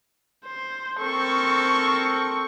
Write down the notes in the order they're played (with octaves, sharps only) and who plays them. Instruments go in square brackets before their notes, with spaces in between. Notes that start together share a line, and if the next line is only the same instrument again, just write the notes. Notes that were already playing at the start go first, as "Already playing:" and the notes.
[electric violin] C5
[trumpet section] C4 A4 A#4 [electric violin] C#6